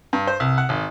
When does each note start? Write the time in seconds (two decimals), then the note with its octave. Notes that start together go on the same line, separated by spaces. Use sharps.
0.13 G2
0.27 C5
0.40 C2
0.58 F#5
0.69 G#1